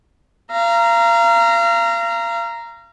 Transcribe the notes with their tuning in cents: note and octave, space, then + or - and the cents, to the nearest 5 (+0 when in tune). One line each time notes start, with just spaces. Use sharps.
F5 -35 A#5 +0